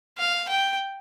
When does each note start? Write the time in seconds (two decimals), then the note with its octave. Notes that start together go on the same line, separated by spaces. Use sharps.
0.18 F5
0.49 G5